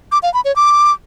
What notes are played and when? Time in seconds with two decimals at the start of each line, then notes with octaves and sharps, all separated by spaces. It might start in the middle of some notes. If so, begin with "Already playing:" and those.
0.12 D6
0.23 F5
0.34 B5
0.45 C#5
0.56 D6